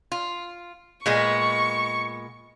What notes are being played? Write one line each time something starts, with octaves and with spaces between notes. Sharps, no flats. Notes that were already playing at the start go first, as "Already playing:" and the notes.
F4
A#2 G#3 B3 C#6